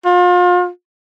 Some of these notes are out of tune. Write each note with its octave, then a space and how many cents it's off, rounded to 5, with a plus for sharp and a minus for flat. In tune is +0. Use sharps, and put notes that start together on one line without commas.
F4 +35